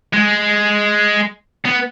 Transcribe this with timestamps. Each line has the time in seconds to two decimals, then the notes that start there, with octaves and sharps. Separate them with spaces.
0.13 G#3
1.66 B3